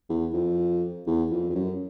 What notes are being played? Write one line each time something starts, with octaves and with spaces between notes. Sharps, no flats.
E2
F2
E2
F2
F2
F#2